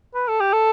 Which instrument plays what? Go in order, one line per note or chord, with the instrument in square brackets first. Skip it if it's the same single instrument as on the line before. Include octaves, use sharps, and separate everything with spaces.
[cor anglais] B4
A4
G4
A4